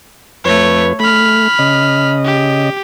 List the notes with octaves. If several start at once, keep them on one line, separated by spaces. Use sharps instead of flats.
F2 A3 B4 C#5
A3 B5 F6
C#3 D#5
G4